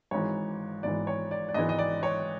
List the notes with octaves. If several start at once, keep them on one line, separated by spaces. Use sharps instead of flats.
G#1 G#2 E3 C#5
G#1 G#2 E3 D5
C#5
D5
D5
G#1 G#2 E3 D#5
D#5
D5
C#5